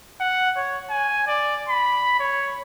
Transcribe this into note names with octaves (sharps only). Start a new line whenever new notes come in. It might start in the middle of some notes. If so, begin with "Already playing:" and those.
F#5
C#5
G#5
D5
B5
C#5